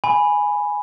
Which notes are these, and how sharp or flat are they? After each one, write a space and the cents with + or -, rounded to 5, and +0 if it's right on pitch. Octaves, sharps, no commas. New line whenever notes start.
G#5 +0 B5 +0